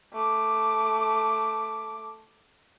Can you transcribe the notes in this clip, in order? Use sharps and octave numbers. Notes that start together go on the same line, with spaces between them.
A3 D6